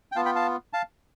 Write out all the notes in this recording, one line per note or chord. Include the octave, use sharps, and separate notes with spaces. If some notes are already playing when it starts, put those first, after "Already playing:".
G5
B3 F4 F5 A5
G5 B5
F5 A5
F5 A5